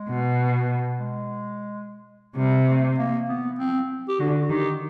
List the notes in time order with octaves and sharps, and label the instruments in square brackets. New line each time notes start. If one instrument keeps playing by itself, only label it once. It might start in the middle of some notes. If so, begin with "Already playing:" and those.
Already playing: [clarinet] G#3
[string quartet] B2
[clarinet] G#3
[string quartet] C3 [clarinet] G3
[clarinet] A3
A#3
B3
C4
G4
[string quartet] D3 [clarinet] F#4
[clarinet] F#4
[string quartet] D#3 [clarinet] G4